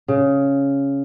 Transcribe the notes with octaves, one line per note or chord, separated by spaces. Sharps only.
C#3